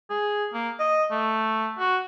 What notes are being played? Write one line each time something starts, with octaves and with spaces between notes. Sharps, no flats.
G#4
A#3
D#5
A3
F#4